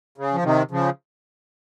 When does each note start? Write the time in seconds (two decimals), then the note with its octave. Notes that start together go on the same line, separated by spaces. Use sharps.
0.18 C#3
0.33 F3
0.44 C3 D#3
0.71 C#3 F3